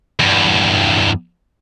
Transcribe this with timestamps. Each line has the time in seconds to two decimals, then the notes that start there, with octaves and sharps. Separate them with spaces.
0.20 E2 G2